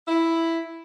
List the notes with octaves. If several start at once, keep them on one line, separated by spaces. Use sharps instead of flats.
E4